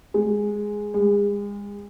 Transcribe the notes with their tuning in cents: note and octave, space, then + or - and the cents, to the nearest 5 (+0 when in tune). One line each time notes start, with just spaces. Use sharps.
G#3 +0
G#3 -35